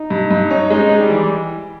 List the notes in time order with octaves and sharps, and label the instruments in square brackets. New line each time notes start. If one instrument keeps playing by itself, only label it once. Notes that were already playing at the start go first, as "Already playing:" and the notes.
Already playing: [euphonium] D#4
[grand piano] G2
G2
C#4
[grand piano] G#3 [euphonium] D#4
[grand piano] G#3
[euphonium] G3
[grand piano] E3